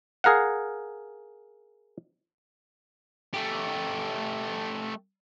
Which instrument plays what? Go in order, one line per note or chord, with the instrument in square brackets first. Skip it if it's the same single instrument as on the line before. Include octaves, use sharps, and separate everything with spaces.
[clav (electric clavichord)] G#4 A#4 F5 F#5
[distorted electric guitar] A3 G4